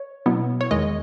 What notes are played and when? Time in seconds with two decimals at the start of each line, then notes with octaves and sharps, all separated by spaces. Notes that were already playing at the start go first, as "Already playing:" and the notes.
Already playing: C#5
0.26 B2 F#3 B3 E4
0.61 C#5
0.71 E2 D#3 G#3 D#5